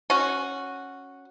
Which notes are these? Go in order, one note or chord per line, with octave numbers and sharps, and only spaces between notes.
C#4 F#4